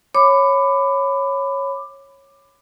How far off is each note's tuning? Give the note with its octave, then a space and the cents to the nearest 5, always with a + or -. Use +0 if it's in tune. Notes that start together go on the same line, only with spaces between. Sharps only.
C#5 -10 B5 +20 D6 +10